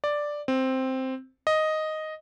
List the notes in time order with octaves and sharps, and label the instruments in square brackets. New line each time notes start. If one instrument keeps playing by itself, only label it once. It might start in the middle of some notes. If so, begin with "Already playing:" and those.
[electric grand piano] D5
C4
D#5